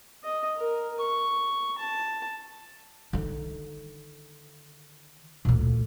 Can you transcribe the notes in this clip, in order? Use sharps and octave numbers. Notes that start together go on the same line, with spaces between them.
D#5
A#4
C#6
A5
D3 D#3
D2 A#2